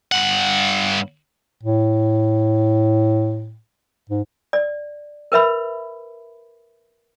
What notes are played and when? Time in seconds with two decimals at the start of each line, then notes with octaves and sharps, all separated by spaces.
0.12 G2 F#5
1.63 A2
4.10 G#2
4.53 D5
5.32 A#4 B4 E5 B5